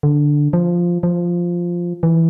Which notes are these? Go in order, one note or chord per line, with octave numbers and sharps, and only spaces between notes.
D3
F3
F3
E3